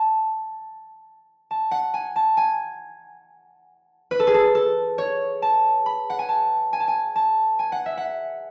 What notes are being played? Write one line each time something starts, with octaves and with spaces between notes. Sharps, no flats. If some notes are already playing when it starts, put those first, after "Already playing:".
Already playing: A5
A5
F#5
G#5
A5
G#5
B4
A4
G#4
A4
A4
C#5
A5
B5
F#5
G#5
A5
G#5
A5
G#5
A5
G#5
F#5
E5
F#5